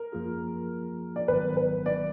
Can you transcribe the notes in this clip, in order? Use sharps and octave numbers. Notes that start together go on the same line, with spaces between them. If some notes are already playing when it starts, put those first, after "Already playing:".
Already playing: A#4
F#2 F3 A#3 F4 G#4
D5
G#1 G#2 D#3 F#3 B3 B4
B4
D5